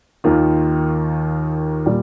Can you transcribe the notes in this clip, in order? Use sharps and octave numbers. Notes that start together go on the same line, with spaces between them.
D#2 D#3 A#3 F4
A#2 G3